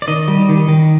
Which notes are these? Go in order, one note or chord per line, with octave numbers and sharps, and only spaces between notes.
D5
D#3 D#5
G3
D#3
D#3